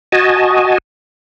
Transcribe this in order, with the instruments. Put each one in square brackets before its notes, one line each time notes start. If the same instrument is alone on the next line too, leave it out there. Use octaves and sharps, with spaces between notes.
[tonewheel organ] F#4 D#5 G#5 A5